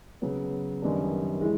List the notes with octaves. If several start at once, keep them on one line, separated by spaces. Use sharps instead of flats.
C#3 F#3 B3
F#2 D#3 G3 B3 D4
E3 G#3